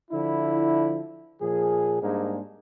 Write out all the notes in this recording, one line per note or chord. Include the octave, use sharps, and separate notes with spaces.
D3 F3 E4
A#2 F3 G#4
G#2 G3 G#3 A#3 D4